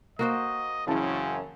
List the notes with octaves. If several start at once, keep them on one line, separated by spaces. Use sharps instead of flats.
A#3 F#4 C5 D#5
F#2 C#3 E3 C4 E4 A5